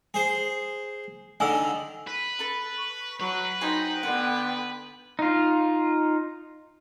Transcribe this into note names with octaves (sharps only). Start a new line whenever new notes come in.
G#4 C5
D3 D#3 G#5 D#6 E6
B4
A4 B5
C#6
F#3 B4
D#4 F#4 C5 G5 G#5
D3 B3 F#5
D#4 F4